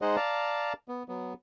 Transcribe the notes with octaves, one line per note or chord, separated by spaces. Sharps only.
G#3 D#4 G#4 C5 D#5 F#5
D5 F5 A5 A#5
B3
F#3 B3